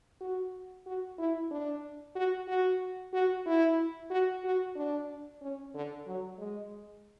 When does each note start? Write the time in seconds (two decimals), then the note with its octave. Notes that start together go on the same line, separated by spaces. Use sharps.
0.21 F#4
0.86 F#4
1.18 E4
1.51 D4
2.15 F#4
2.48 F#4
3.13 F#4
3.46 E4
4.11 F#4
4.44 F#4
4.76 D4
5.42 C#4
5.74 D3
6.07 F#3
6.38 G#3